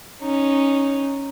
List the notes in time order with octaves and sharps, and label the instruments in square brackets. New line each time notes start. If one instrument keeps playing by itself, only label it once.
[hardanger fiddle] C#4 D#4